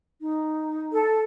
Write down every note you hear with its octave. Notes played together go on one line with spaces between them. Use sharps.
D#4
A4